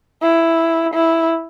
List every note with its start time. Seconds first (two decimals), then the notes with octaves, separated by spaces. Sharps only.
0.22 E4
0.94 E4